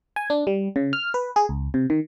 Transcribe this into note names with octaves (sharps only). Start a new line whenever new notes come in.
G#5
D4
G3
C#3
F6
B4
G#4
C#2
C3
D#3